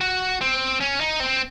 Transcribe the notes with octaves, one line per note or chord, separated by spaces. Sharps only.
F#4
C4
C#4
D#4
C4